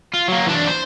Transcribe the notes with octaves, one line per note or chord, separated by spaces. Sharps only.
F4
F#3 A#3
E3 D4
C5